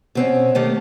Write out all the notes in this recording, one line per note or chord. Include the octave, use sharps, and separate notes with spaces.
B2 C4 C#4
D#3 A3 A#3 G4